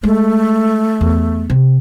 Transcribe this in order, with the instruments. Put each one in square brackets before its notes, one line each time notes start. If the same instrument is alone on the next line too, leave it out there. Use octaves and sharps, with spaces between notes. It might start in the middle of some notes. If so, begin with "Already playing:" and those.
[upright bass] G#3 [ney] A3
[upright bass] E2
C3